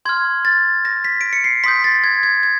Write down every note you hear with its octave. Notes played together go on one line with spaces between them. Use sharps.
C6 F6 G#6
A6
A#6
B6
D7
C#7
C7
C6 D#6 G6 B6
A6
G#6
G#6
G#6